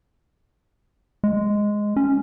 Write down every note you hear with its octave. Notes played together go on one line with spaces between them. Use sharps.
G#3
C#4